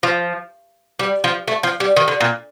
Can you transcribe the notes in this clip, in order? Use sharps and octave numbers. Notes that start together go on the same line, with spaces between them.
F3
G3
F3
A3
F3
G3
D#3
D3
A#2